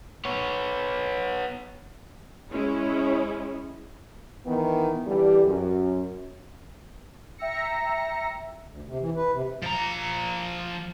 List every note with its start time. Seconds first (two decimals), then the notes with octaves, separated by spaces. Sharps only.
0.25 B3 C#5
2.52 G#3 C#4 E4
4.46 D#3 E3 B3
5.06 D3 E3 G3
5.45 F#2
7.38 E5 G5 A#5 E6 A#6 C#7
8.67 D2
8.87 C3
8.99 E3
9.16 B4
9.31 C3
9.62 F3 A#5